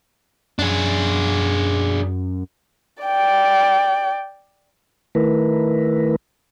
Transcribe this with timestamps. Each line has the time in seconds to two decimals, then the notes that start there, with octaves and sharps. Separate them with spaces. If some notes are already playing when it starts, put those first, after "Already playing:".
0.59 F#2 D4 G#4
3.04 D5 G5
5.15 D#3 A3 E4 A#4 B4